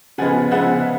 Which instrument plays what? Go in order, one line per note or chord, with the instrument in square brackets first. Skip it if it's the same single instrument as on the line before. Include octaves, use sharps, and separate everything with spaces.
[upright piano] C#3 F3 G#3 B3 F#5 G#5
C#3 F3 G#3 B3 E5 F#5